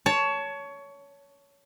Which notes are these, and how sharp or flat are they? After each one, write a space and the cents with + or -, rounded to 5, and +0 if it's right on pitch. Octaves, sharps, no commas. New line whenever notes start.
C#5 +20 A5 +0